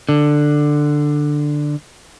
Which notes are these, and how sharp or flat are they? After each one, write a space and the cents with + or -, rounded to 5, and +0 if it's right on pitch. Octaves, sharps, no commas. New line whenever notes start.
D3 +10